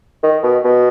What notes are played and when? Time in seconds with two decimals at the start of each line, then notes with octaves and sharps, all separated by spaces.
0.23 D#3
0.43 B2
0.64 B2